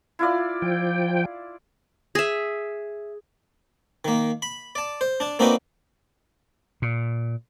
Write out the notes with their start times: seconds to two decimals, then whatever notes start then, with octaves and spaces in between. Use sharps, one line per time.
0.19 E4 F4 D5
0.62 F3 G5
2.15 G#4 E5
4.05 D#3 A#3
4.42 B5
4.75 D5 A5
5.01 C5
5.20 D4 A5
5.39 A#3 C4 D4 D#4 F#4 B4
6.82 A#2